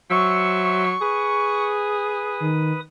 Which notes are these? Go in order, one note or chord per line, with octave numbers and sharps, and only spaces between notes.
F#3 C5 E5 C#6 E6
G#4 B4 D#6
D#3